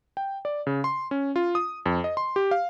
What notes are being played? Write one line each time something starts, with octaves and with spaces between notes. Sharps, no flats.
G5
D5
C#3
C6
C#4
F4
D#6
F2
D#5
C6
G4
F5